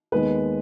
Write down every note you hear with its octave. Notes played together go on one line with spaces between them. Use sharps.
D#2 D#3 G#3 B3 B4